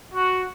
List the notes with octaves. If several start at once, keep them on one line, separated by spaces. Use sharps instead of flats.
F#4